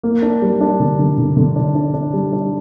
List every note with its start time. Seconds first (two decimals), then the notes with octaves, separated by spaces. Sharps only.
0.03 A#3
0.22 D4
0.42 G3
0.61 D4
0.80 D3
0.99 D3
1.18 D3
1.37 D3
1.56 D4
1.75 D4
1.94 D4
2.13 G3
2.32 D4